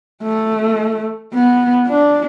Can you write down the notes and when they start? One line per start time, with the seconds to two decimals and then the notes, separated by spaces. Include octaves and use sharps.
0.23 A3
1.34 B3
1.88 D4